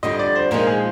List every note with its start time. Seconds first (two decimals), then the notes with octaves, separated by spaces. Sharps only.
0.03 F2 D3 G3 D#5
0.19 D5
0.35 C5
0.51 A#2 F3 G#3 D#4 A#4
0.67 G#4